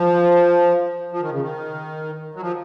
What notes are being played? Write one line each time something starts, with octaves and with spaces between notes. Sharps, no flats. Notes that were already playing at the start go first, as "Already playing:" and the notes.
Already playing: F3
F3
D#3
C#3
D#3
F#3
F3